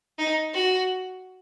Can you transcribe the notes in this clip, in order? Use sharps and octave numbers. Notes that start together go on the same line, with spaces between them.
D#4
F#4